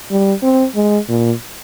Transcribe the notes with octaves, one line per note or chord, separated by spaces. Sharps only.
G3
C4
G#3
A#2